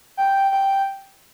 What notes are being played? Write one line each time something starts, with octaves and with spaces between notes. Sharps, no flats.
G5
G5